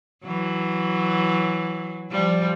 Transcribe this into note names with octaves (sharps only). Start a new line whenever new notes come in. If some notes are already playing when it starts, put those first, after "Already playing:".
E3 F#3
F3 G3